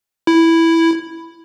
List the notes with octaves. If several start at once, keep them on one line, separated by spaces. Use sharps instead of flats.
E4